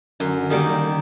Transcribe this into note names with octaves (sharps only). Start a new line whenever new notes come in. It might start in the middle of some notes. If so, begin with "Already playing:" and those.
F#2 D3
D#3 G3 A#3